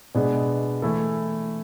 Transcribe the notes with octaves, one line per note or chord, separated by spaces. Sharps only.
B2 G#3 B3 D4 G#4
E3 A3 E4 A4